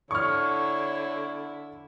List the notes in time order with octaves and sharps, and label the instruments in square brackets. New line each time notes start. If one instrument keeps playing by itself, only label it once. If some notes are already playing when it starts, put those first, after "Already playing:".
[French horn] D3 [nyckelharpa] E4 [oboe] C#5 [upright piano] C#6 F6